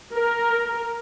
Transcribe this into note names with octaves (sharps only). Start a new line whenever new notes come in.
A#4